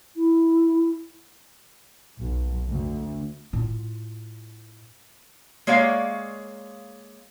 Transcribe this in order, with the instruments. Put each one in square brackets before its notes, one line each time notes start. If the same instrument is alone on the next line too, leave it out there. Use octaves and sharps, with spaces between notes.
[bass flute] E4
[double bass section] B1
D2
[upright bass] A2 F4
[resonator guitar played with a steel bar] G#3 A#3 C#5 D5 F5